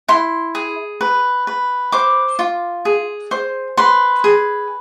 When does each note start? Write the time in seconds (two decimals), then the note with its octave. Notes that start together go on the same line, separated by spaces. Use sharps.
0.08 E4 C6
0.55 G#4
1.01 B4
1.47 B4
1.92 C5 D6
2.39 F4
2.85 G#4
3.31 C5
3.77 B4 C6
4.24 G#4